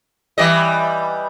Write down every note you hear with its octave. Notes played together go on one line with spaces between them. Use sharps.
E3 G3 D#5